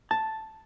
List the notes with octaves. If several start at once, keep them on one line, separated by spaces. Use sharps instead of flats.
A5